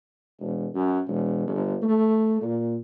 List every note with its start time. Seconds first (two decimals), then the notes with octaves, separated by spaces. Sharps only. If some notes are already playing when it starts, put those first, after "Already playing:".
0.39 E1
0.75 F#2
1.07 E1
1.47 G1
1.82 A3
2.41 A#2